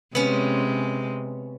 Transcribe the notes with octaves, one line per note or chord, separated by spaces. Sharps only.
C3 G#3 B3 C#4